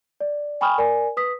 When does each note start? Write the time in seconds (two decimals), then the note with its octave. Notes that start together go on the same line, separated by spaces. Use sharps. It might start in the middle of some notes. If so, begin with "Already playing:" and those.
0.20 D5
0.61 G5 G#5 B5 C#6 D#6 F6
0.78 A#4 D5 G#5
1.17 B4 D#6 B6